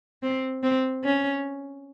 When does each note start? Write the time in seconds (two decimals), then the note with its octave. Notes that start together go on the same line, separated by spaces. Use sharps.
0.23 C4
0.63 C4
1.04 C#4